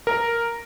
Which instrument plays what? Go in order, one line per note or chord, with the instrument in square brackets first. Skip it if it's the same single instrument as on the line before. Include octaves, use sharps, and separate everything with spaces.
[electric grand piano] A#4